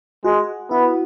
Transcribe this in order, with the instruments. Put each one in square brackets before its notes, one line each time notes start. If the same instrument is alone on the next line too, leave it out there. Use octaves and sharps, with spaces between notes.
[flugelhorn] G#3 [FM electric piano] F#4
[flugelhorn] B3 [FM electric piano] E4